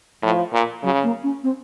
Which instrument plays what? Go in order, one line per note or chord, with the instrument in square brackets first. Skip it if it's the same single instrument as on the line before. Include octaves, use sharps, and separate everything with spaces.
[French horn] A2 [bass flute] F3
[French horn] A#2
[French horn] C#3 [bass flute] F#3
[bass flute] A#3
C#4
C4